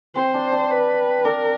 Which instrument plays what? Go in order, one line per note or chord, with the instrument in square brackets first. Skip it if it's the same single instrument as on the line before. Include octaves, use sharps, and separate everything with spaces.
[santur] C4 [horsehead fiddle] C5
[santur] D4
D4
[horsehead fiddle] B4
[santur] D4 [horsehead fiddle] A#4